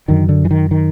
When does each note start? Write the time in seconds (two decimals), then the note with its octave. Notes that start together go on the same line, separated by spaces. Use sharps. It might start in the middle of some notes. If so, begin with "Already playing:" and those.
0.08 F#2 D3 D#3
0.29 D3
0.45 E3
0.51 D#3
0.71 D#3